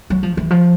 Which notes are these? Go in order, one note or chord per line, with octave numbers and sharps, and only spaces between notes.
F#3
F3
E3
F3